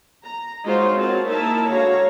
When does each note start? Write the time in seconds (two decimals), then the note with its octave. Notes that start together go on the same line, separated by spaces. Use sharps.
0.24 A#5
0.64 G#3 D#4 F4 F#4 C5 C#5
0.97 C4 F#4 G#4 A#4 C#5 A5
1.27 A#3 D#4 E4 A#4 E5 A5
1.69 D3 G#3 F#4 C#5 F5 A#5